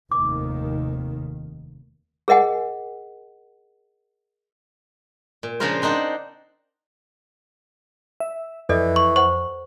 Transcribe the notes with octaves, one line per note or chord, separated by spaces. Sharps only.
F1 D#2 D#3 D6
G#4 A#4 D#5 F#5 G#5
A#2
C#3 F3 D4 F4 A#4 C5
C4 D4 D#4 C5 F#5
E5
F2 E3 A4 D5 D#5
C#6
C5 F#5 C#6